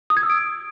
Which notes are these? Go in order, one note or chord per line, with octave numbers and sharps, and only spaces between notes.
D#6
G#6
E6
D7